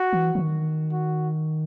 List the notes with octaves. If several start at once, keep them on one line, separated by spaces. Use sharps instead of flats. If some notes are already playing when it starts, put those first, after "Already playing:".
Already playing: F#4
E3
E3
D#3
F#4